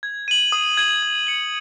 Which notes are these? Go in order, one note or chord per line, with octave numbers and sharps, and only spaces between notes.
G#6
D#7 F#7
D#6
G#6 D#7 F#7
G#6
C#7 F#7